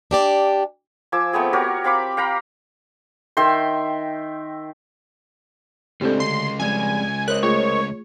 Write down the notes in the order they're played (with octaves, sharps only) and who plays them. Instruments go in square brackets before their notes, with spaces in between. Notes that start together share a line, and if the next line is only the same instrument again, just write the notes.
[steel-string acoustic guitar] D4 G4 D5
[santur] F3 G#5 D6 E6
A3 B3 C4 G#4
F#4 G4 A#4 C#5
C4 F5 B5 D6
F5 G5 A#5 B5
[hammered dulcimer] D#3 E5 G5 C6
[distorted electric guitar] C#2 [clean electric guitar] A2 C4 D4 [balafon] G4 A4
[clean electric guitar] D2 [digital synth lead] C6
[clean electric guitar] F2 G3 G#3 [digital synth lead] G#5
[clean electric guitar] A#4 C5 D#5 [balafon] C#5 [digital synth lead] F#6
[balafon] A3 F4 G#4 [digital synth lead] C#5